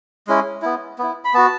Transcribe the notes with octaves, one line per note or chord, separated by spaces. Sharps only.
G#3 C#4 E4
B3 E4
B3 E4
B5
B3 F#4 A5